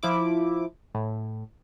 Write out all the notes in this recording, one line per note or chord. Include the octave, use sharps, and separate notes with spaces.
F3 E4 D6
A2